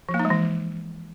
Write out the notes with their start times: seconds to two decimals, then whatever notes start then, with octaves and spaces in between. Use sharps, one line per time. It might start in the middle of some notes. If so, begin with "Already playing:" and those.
0.09 F3
0.14 A#3
0.19 D#4
0.25 G#3
0.30 E3